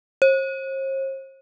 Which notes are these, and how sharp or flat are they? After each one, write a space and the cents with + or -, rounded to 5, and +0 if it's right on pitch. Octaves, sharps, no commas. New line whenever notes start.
C5 +45